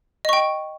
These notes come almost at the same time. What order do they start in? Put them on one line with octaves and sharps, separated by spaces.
D#5 C#6 G5